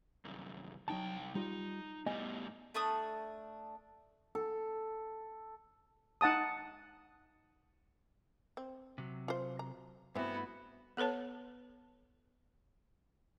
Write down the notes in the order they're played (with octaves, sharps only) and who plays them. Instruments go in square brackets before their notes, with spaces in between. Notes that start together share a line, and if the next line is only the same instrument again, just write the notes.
[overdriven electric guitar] C2 F#2
[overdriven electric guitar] C2 G5 [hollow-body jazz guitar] F#3 D#4 A5
[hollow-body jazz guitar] G3 F4 [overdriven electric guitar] D#4
[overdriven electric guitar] A2 G3 [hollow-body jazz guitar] B3 D#5 G#5
[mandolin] A3 D4 C#6 D#6
[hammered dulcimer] A4
[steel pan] D#4 F#5 A5 D#6
[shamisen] C4
[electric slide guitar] C3 F#3
[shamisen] F4 C5
A#5
[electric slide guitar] G2 A3 F#4 [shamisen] E3 C4 [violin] B3 E4
[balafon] B3 A4 B4 C#5 A5